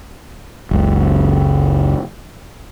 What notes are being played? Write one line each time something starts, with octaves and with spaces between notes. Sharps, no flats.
F#1 C#2